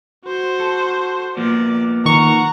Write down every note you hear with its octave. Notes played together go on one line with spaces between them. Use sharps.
F#4 C5
A4
F3 A#3 B3 D5
D#3 F#5 A#5 C#6